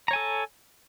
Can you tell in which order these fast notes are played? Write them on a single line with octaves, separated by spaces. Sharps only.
A#5 C#5 G#5 A4